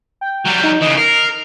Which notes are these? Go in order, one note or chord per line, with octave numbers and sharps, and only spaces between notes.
G5
F#3 G3
D#4
C#3 E3 D#5
A#4 C7